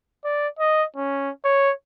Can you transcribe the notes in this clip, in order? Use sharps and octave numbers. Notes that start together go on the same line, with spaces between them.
D5
D#5
C#4
C#5